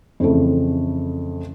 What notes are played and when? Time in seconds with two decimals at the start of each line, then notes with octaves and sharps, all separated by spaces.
0.20 F2 C#3 E3 A3